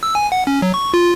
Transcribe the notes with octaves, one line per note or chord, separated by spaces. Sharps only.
E6
G#5
F#5
C#4
F#3
C#6
F4